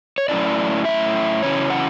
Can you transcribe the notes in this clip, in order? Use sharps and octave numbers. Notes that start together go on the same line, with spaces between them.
C#5
A2 F#3 A3 C#4 E4 D5
E5
E2 C#3 F#3 C#4 E4 C#5
F#5